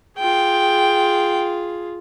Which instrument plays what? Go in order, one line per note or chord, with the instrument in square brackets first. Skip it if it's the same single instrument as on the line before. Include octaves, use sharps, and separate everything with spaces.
[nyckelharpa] F4 G#4 [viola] G5